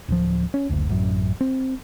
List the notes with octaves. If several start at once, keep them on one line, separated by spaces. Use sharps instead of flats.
D1 F3
C#4
F#1 D2
A1 F#2
C4